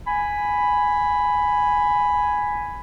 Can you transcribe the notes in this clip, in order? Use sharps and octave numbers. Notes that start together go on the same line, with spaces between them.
G#5 B5